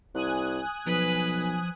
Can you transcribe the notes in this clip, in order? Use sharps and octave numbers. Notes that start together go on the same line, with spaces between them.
C2 G#5 D#6 F#6
B1 F3 B4